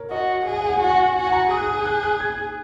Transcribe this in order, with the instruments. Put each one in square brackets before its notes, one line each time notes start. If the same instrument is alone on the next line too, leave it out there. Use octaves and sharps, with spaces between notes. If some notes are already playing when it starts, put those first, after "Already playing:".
Already playing: [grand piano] A#4 C#5
[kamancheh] F#4 [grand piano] D#5
[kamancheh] G#4 [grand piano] F#5
[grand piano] G#5
F#5
G#5
F#5
[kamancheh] F#4 [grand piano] G#5
[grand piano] F#5
[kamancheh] F#4 [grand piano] G#5
[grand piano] G#5
A#5
[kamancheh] G#4 [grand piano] D#6
[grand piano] F#6
D#6
D#6
F#6
F#6
G#6